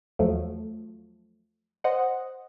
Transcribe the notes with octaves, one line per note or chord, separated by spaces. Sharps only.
E2 F3 F#3 A3
C5 D#5 F#5